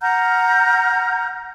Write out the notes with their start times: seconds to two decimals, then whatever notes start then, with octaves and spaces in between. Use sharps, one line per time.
0.01 F#5 A#5 F6 G6